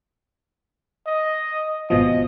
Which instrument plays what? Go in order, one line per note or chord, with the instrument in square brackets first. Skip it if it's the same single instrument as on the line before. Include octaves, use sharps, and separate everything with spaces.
[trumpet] D#5
[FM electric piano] G#1 B2 F3 [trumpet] D#5